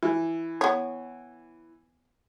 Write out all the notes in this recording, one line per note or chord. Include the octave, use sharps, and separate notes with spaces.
E3
B3 C#5